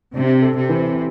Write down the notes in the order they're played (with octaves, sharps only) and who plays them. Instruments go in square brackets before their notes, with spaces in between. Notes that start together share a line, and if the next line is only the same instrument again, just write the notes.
[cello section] C3 [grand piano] D4
[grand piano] A4
[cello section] C3
[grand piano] E3